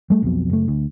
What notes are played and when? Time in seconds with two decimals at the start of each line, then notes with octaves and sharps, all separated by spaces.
0.10 G3 A3
0.23 B1 F2 B2
0.50 F#1 A3
0.68 D2